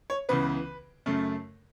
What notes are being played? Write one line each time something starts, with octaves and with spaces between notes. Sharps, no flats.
C#5
C#2 C#3 E3 B3 B4
F#2 C#3 A3